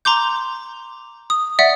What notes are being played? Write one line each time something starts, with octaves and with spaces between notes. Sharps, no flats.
A#5 C6 D6 G6
D#6
D5 E5 F#5